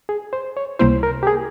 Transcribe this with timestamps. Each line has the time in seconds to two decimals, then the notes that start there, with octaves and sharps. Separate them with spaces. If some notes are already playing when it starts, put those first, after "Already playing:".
0.09 G#4
0.33 C5
0.57 C#5
0.79 C#2 C3 G3 A#3 E4 C5
1.03 A#4
1.23 G4
1.27 G#4